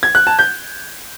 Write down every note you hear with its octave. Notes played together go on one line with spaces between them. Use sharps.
G#6
F#6
A5
G6